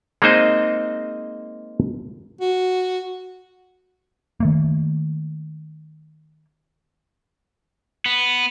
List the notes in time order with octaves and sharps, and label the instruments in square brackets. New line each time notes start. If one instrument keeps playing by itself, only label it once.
[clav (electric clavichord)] G#3 A#3 C4 D#4 C5 D#5
[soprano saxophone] F#4
[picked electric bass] D#3 A3 A#3
[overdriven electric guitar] B3